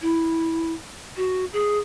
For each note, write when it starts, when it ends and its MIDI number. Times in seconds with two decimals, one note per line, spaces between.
0.01 0.72 64
1.17 1.45 66
1.53 1.79 68